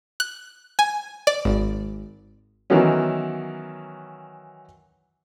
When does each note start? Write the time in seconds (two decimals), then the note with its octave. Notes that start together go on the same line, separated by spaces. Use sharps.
0.20 F#6
0.79 G#5
1.27 D5
1.45 G#1
2.70 D#3 E3 F#3 B3 C#4